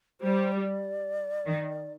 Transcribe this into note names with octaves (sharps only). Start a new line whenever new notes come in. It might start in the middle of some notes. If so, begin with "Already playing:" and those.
G3 C5
D5
D#3